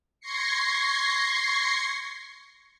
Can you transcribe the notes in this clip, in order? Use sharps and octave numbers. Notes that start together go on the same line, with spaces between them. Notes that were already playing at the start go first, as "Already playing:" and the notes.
C6 C#6 G#6 A#6 C7 C#7